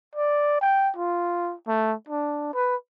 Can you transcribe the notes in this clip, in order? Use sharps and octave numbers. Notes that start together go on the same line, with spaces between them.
D5
G5
F4
A3
D4
B4